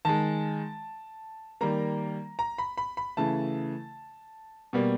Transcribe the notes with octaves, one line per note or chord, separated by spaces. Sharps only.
D#3 G#3 A5
D#3 G3 A#3 A#5
A#5
B5
B5
B5
C#3 E3 A3 A5
B2 G3 A#3